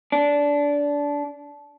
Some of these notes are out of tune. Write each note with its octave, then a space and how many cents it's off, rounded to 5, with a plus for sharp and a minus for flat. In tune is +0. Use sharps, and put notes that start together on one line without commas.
D4 -20